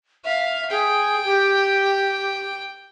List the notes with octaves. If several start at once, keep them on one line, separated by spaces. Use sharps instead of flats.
E5 F5
G#4 G5
G4